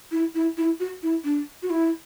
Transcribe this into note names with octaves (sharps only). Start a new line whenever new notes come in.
E4
E4
E4
F#4
E4
D4
F#4
E4